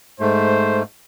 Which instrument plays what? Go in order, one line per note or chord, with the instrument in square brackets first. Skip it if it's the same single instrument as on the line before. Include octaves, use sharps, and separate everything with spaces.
[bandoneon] G#2 A3 [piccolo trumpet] C5